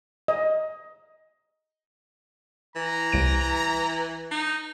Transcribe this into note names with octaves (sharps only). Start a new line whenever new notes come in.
D#5
E3 A#5
C2 D7
D#4